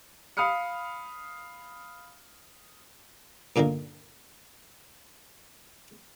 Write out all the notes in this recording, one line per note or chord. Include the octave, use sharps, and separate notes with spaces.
F5 B5 D#6 F6 C#7
G2 A#2 D3 D#3 A#3